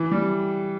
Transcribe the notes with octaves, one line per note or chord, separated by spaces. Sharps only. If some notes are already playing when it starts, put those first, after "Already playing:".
Already playing: E3
G3